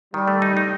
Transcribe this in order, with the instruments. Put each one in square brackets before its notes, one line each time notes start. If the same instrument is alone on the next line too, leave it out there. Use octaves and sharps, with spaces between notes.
[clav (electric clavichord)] D#3 [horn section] G3
[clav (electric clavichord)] A3
D#4
D#4